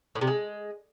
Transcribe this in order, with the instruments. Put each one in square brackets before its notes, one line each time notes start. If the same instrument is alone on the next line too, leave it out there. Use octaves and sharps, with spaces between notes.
[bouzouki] A2
C3
G#3